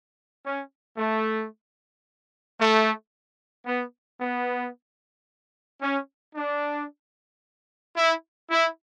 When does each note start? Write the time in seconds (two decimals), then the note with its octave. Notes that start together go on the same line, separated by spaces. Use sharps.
0.44 C#4
0.97 A3
2.59 A3
3.66 B3
4.19 B3
5.81 C#4
6.35 D4
7.95 E4
8.50 E4